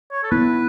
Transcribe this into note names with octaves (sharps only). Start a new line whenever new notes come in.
C#5
A4
B3 E4 B4